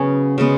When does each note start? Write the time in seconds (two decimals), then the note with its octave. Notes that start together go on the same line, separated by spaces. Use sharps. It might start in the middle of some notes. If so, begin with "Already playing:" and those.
Already playing: C#3 F#3 B3 C#4 C#5
0.38 C#3 G#3 B3